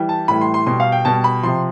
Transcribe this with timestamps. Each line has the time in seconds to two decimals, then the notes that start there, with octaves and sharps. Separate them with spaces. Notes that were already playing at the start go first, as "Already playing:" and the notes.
Already playing: E3 G3
0.09 A5
0.28 A2 E3 G3 B5
0.41 C6
0.54 C6
0.66 B2 G3 C6
0.80 F5
0.92 G5
1.05 B2 G3 A5
1.24 B5
1.43 C3 F3 C6